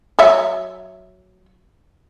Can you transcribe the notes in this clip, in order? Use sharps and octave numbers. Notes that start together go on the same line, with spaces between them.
F#3 C#5 E5